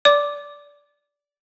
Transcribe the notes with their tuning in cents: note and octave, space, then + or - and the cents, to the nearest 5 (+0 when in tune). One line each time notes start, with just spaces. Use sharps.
D5 -15 D6 +0